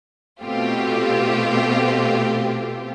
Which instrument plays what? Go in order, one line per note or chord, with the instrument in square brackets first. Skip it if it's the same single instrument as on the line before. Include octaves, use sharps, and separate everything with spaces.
[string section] B2 A3 C4 F4 G4